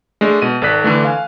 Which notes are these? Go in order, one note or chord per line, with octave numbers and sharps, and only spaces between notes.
G#3 A3 D4
B2 D#7
G#1 A4 D5 F#6 B6
D3 E3 A3
F5 G#5